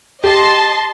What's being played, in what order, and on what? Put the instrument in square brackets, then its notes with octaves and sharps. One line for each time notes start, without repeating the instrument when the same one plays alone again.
[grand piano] G4 [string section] D#5 A5 C6